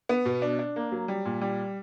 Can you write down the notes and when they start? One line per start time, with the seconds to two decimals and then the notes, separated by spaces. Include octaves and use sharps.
0.09 B3
0.25 B2
0.42 D4
0.59 D4
0.76 A#3
0.92 F#3
1.08 G3
1.25 A#2
1.41 G3